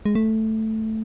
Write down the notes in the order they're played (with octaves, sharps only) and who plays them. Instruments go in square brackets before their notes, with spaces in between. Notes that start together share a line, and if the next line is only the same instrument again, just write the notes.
[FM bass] G#3
A3